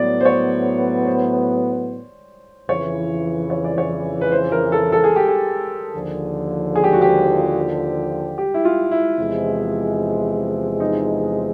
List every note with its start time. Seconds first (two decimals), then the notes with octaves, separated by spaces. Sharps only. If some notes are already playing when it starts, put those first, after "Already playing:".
Already playing: A2 F#3 B3 D5
0.21 C5
0.25 C#5
1.06 C5
2.69 F2 C#3 E3 C#5
3.50 C#5
3.64 D5
3.78 C#5
4.21 B4
4.32 C5
4.52 A#4
4.72 A4
4.92 A4
5.04 G#4
5.16 G4
5.28 G#4
5.94 D#2 D3 F3
6.76 G#4
6.84 G4
6.93 F#4
7.02 G4
8.38 G4
8.54 E4
8.65 F4
8.91 E4
9.18 E2 C3 F3 G#3
10.80 D#4